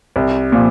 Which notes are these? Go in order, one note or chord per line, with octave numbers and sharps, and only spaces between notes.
C2
A#2 F3